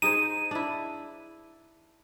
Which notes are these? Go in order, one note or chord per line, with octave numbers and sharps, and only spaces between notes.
D#4 G#4 C5 D#7
D4 E4